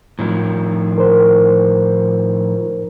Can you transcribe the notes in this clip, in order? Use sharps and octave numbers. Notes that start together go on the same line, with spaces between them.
A2 D#3 F3
A#4 C5